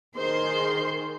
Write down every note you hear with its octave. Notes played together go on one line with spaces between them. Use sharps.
D#3 G#4 C5 C6